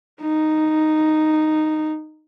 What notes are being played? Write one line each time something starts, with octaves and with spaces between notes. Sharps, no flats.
D#4